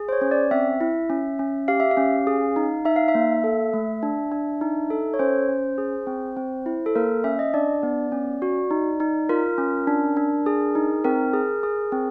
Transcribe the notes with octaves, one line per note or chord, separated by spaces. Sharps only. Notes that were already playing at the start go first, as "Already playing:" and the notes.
Already playing: G#4
C5
C#5
C#4
D5
C4 E5
E4
C#4
C#4
G4 F5
E5
F5
C#4
G#4
D#4
D#4 E5
F5
E5
A#3
A4
A3
D4
D4
D#4
A4
C#5
C#4 C5
C#4
G#4
C4
C4
E4
A4
A#3 A#4
C#4 E5
D#5
D4 D5
B3
C#4
F#4
D#4
D#4
F4 A#4
C#4
D4
D4
G#4
D#4
C4 A#4
G#4
G#4
C4